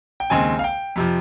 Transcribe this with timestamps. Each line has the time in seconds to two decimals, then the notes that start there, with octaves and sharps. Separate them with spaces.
0.20 G5
0.30 D#2 C#3 G#3 C4 G#5
0.59 F5
0.64 G5
0.96 F2 C3 F3